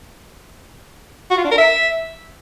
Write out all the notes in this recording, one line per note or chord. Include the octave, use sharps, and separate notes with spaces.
F#4
F4
D4
A#4
E5